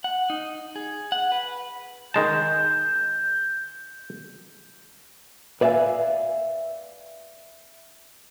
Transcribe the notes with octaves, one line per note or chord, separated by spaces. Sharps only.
F#5
D#4
G#4
F#5
B4
D#3 G#3 A5 G6
B4 D5 E5 F5 G#5